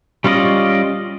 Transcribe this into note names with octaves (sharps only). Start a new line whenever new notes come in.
G3 C#4 F4 D5 D#5